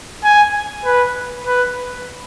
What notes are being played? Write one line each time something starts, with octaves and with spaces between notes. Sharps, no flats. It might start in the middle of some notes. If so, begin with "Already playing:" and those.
G#5
B4
B4